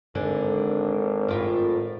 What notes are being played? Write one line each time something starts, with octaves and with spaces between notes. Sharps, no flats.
G#1 D3 G#3
A2 F4 A#4